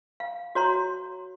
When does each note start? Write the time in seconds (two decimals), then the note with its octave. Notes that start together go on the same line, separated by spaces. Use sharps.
0.20 F5
0.55 F#4 C#5 A#5 C6